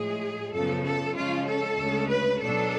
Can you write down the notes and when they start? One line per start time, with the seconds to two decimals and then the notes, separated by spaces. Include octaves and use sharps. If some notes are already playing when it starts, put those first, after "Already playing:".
Already playing: A2 F3 G#3 G#4
0.52 F#2 C#3 F3 B3 A4
0.83 A4
1.14 C#3 F3 G#3 C#4 F4
1.45 A4
1.77 D2 C#3 G#3 C#4
2.08 B4
2.38 B2 F#3 B3 D4 A4